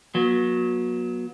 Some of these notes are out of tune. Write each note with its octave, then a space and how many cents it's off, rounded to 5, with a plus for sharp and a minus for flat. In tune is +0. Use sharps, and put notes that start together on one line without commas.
F#3 -20 B3 -45